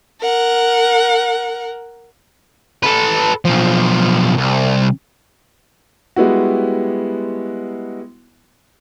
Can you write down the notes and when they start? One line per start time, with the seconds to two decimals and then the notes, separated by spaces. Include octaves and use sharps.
0.21 A#4 F#5
2.83 A4 B4
3.45 B1 F3
4.37 C2
6.16 G3 G#3 B3 E4 F#4